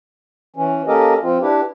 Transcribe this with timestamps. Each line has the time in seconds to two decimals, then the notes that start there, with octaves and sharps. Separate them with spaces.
0.56 E3 C#4
0.87 A#3 C#4 G4 A4 A#4 D#5
1.23 F3 C4 F4
1.41 D4 E4 G4 B4